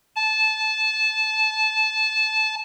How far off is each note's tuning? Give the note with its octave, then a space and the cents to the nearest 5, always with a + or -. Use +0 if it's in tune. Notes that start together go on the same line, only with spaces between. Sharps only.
A5 -20